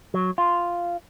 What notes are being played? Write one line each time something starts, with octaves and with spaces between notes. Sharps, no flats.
F#3
F4